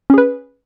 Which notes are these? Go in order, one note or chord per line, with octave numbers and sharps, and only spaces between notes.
C#4 G#4 B4